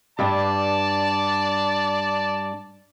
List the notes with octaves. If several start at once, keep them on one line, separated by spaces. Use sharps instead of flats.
G2 G3 D4 D5 A5